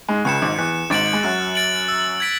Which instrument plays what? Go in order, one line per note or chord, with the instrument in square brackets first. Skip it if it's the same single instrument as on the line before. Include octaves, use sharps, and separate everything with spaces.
[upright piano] G#2 G#3
[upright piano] C#2 C#3 [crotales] F#6 C#7 E7
[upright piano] G#1 G#2
[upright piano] E2 [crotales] F#6
[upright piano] G#1 G#2 [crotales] A6 D7 F#7
[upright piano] G#3
[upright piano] F#2 F#3 [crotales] F#6
[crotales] A6 D7 F#7
E6
G#6 B6 D7